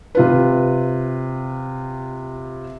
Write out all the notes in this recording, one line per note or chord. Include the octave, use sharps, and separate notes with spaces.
C3 F4 B4